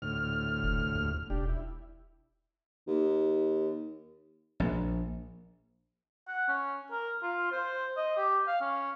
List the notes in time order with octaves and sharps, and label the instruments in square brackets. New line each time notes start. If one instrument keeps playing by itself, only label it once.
[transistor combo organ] D2 A2 F6
[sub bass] F1
D#2
[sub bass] E1 [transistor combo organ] D4 G4
[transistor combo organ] E4
[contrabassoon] D#2
[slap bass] A#1
[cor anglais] F#5
C#4
A#4
F4
C5
D#5
G4
F5
C#4